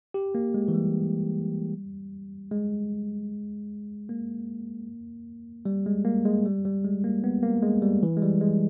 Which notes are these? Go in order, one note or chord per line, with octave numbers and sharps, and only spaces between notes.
G4
A#3
G#3
E3
G3
G#3
A#3
G3
G#3
A#3
G#3
G3
G3
G#3
A#3
B3
A#3
G#3
G3
E3
G#3
G3
G#3